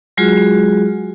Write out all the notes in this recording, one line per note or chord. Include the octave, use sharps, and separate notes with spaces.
F#3 G#3 F4 F#4 G#4